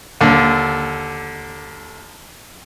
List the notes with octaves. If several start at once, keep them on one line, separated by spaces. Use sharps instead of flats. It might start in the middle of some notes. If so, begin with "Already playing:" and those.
D#2 D3